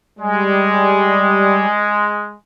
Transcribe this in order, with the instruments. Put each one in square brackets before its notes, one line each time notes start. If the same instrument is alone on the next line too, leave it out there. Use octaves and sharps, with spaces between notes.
[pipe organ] G3 [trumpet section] G#3